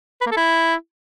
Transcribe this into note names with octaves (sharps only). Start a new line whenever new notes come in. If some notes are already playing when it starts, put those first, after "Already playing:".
B4
A#3
A4
E4